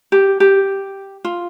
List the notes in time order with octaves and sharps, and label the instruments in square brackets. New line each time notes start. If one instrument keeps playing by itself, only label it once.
[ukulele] G4
G4
F4